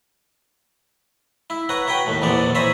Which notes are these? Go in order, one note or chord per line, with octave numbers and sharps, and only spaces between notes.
E4
B4 C#5 F#5 A#5
F#4 B4 C#5 G5 B5
D#2 A2
A#1 E2 C3 E3 B3 D5
C5 C#5 E5 G#5 A#5 B5